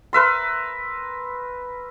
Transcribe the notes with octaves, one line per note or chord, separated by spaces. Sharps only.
A#4 B4 E5 C6